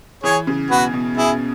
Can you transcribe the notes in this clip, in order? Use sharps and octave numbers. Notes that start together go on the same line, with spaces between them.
E3 G#4 C#5
C#3
B2 F#4 B4
B2
B2 E4 G#4